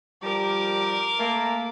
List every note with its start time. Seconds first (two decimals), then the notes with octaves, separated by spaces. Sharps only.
0.23 F3 G3 A#4 D6
1.19 A3 A#3